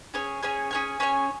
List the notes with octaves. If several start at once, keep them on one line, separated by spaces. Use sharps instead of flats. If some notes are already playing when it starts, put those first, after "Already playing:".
C#4 G#4 C#5 G#5
C#4 G#4 C#5 G#5
C#4 G#4 C#5 G#5
C#4 G#4 C#5 G#5